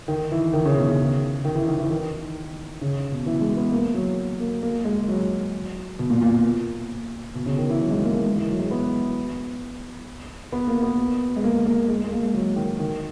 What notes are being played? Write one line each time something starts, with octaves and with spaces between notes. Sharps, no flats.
D#3
E3
D#3
C#3
B2
C#3
D#3
E3
D#3
E3
D#3
C#3
B2
E3
G#3
B3
A#3
F#3
A#3
A#3
G#3
F#3
B2
A#2
A#2
B2
C#3
D#3
E3
F#3
G#3
A#3
A#3
G#3
E3
F#3
G#3
B3
B3
A#3
B3
G#3
A#3
A#3
G#3
G#3
A#3
G#3
F#3
D#3
D#3